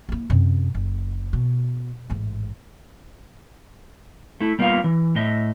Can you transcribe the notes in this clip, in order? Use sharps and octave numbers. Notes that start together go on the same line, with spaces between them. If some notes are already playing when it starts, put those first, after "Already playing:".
A#3 E4
F#2 C3
F#1
B2
A1 G#2
A3 E4
G3 A#3 B3 F4 F5
E3
A2 D#5 E5